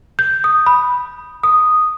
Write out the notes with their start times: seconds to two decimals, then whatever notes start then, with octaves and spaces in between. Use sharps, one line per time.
0.19 G6
0.44 D#6
0.66 B5
1.43 D#6